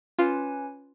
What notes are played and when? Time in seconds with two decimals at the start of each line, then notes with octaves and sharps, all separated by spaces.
0.19 C#4 F4 B4 G#5